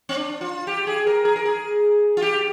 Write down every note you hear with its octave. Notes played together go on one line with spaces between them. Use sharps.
C4
D4
F4
G4
G#4
A#4
G#4
A#4
G#4
F4
G4